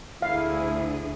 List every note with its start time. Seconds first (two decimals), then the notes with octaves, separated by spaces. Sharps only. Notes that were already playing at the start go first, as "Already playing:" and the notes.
0.22 D2 D3 E4 G#4 F5